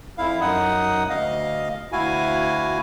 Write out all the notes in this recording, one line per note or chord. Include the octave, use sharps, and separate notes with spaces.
F2 E4 F5
F#2 D#4 F#5 D#6
D2 D#5 F5
D2 E4 F#4 F5 G#5